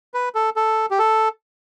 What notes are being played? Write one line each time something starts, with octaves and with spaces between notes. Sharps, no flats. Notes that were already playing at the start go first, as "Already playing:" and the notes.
B4
A4
A4
G4
A4